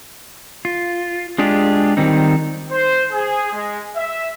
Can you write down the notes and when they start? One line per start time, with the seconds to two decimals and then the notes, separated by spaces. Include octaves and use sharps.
0.65 F4
1.38 G#3 D4 F4 G4 G#4
1.97 D#3 G3 C4 D#4
2.71 C5
3.11 G#4
3.52 G#3
3.96 E5